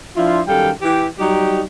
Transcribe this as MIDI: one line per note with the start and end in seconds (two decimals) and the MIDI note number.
0.15 0.40 53
0.15 0.40 62
0.15 0.40 64
0.15 0.40 65
0.47 0.70 42
0.47 0.70 51
0.47 0.70 55
0.47 0.70 69
0.47 0.70 77
0.47 0.70 79
0.82 1.07 52
0.82 1.07 67
1.18 1.61 54
1.18 1.61 55
1.18 1.61 63
1.18 1.61 67